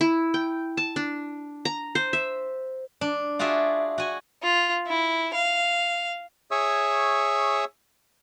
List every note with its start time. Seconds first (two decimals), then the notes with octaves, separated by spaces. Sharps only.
0.01 E4
0.34 G5
0.77 A5
0.96 D4
1.65 A#5
1.95 C5
2.13 E5
3.01 D4
3.39 F4 F#4 G#4 D5 E5
3.98 F#4 G#5
4.43 F4
4.87 E4
5.34 F5
6.51 G#4 C#5 E5 C#6 D#6 E6